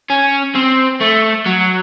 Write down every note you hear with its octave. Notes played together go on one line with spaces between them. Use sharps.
C#4
C4
A3
F#3